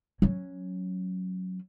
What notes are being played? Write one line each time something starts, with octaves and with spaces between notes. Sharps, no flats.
F#3 C#4